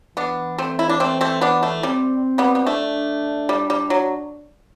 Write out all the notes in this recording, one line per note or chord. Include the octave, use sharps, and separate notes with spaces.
E3 B3 D4
A3 C4
E4
D4
A3 C4
A3 C4
B3 D4
A3
G3 C4
G3 B3
B3
A3 D4
G3
G3
F#3